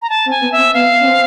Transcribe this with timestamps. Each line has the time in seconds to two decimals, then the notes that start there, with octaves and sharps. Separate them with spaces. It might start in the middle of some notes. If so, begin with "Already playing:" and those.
0.02 A#5
0.10 A5
0.26 C4
0.31 G#5
0.41 B3
0.52 E5
0.58 C4
0.74 B3 F5
1.01 C#4
1.05 C4